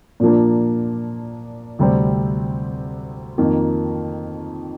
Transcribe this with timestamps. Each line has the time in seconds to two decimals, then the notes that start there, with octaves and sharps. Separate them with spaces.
0.20 A#2 F3 A#3 D4
1.79 D2 C3 G3 C4
3.38 F2 D#3 A#3